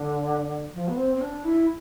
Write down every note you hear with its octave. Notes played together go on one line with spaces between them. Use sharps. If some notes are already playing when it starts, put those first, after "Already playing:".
Already playing: D3
F3
B3
C4
C4
D4
E4